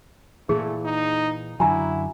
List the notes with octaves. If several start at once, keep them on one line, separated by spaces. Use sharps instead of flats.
A#2 E3 A3 G#4
D#4
F#2 D3 F#3 E4 G#5 A#5